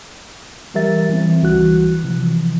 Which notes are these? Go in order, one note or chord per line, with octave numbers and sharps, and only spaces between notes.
E3 G3 G4 A#4 E5 A6
E3 G3 C4
C#2 E3 G3 F#4 F#6
C3 E3 F3